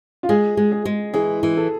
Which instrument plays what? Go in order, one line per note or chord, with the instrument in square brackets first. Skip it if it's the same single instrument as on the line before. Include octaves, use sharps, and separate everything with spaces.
[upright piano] F4
[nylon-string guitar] G#3 [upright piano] G#4
[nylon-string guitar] G#3
[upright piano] G#4
[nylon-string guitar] G#3
[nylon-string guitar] E3 [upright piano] G#4
[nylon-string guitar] E3
[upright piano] A4